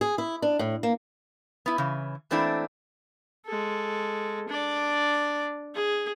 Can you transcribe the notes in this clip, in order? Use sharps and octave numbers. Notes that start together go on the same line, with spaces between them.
G#4
E4
D4
A2
A#3
B3 E4
C#3 E3
E3 A3 A#3 C4 D4 E4
G#3 A4
D4 D5
G#4